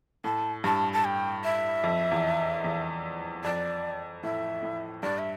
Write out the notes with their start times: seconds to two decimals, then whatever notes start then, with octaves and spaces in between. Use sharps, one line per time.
0.24 A2 A5
0.64 G2 A5
0.93 A5
1.05 G5
1.44 E5
1.84 F2
2.11 E2
2.64 E2
3.44 F2 D5
4.23 A2 E5
4.63 A2
5.03 G2 D5
5.18 E5